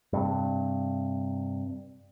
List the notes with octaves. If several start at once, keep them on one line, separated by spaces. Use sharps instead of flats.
G2 C3